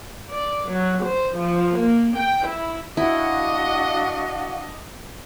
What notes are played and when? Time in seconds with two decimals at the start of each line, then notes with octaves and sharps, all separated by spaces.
0.28 D5
0.68 F#3
1.02 C5
1.35 F3
1.75 A#3
2.16 G5
2.45 E4
2.97 D4 E4 F#4 D#5 F5 F#5